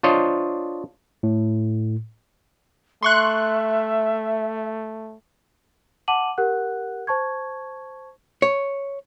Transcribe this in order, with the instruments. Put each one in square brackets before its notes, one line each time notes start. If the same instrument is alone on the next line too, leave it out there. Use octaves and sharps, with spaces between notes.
[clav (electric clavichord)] D4 F4 C5 C#5 D#5
[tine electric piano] A2
[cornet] A3 [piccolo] E5 [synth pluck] C6 C#6 F#6
[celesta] F#5 A5 D6 D#7 F#7
G4 A#4 F#5 F#6
C5 A5 C#6 G#6
[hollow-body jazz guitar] C#5